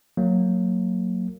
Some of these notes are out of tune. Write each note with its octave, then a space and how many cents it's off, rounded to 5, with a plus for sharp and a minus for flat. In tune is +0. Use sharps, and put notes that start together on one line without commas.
F#3 -10 A#3 -25